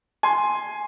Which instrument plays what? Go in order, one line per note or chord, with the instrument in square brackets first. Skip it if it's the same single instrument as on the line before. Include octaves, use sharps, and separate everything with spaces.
[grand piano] G#5 C6